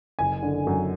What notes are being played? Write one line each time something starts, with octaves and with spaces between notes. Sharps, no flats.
F#1 G#5
D3
F#2